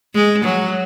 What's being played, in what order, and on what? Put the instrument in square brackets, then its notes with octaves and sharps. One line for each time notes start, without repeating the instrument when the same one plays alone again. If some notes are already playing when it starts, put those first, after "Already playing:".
[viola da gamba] G#3
F#3